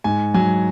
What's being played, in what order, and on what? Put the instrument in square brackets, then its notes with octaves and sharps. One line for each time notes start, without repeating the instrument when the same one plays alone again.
[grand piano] G#2 G#5
F#3 G#5